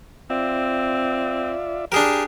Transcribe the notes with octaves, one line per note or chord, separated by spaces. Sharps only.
C4 F4 D5 E5
D4 G4 G#4 A#4